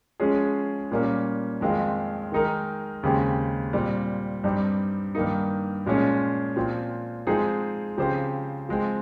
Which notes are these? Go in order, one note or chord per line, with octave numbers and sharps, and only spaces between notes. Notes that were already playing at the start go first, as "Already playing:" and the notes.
F3 G#3 C#4 G#4
A#2 G3 A#3 C#4
F2 D#3 G#3 C4 F4
D#3 G#3 D#4 A#4
D#2 C#3 G#3 C4 G4
A#2 G3 C4
G2 G3 C4 D#4
G2 D#3 A#3 D#4
A#2 F3 G#3 C#4
A#2 F3 C4
F3 G#3 C4 D#4 G#4
C#3 F3 C4 G4 C5
F3 G#3 C4